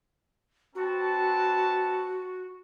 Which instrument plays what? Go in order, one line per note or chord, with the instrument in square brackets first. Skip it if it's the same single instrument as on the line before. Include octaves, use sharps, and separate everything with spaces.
[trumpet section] C4 B4 A5 [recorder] F#4